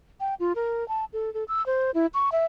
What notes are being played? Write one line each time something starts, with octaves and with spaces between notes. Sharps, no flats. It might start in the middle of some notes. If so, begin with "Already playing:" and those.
G5
F4
A#4
A5
A4
A4
E6
C5
E4
C#6
E5